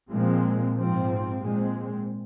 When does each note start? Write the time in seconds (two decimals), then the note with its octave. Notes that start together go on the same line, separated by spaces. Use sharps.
0.12 A#2 F3 G#3 C4
0.74 G#2 F3 C4
1.38 A#2 G#3 C4